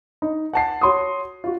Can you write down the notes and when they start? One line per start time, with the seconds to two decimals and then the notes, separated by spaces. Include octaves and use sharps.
0.22 D#4
0.53 F#5 A5 C7
0.81 F#4 C#5 C6 C#6 D#6
1.44 F4 F#4